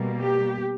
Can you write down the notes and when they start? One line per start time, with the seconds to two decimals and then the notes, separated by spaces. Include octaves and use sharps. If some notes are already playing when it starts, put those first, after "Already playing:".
Already playing: B2 G3 A#3
0.18 G4